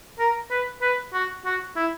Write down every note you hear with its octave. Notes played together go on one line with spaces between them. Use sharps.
A#4
B4
B4
F#4
F#4
E4